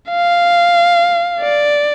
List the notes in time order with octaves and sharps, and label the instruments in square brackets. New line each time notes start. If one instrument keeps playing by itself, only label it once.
[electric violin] F5
D5